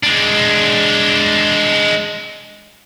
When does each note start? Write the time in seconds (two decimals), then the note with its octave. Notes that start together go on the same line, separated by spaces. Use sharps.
0.03 G#3 D4